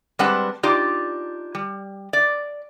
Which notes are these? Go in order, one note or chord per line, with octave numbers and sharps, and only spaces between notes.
G3 G#3 C4 D4 B4 F#5
D4 D#4 F4 G4 D5
G3
D5